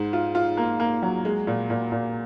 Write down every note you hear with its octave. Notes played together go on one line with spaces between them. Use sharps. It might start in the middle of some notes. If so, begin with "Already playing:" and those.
Already playing: G#2
F4
F4
A#3
A#3
F#3
G#3
A#2
A#2
A#2